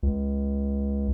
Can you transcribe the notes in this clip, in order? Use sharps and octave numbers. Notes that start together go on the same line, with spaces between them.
C#2